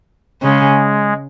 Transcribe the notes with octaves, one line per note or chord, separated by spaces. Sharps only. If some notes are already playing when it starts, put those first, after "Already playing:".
C#3 G#3